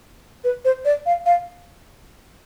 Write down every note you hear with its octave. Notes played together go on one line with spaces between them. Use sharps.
B4
C5
D5
F5
F5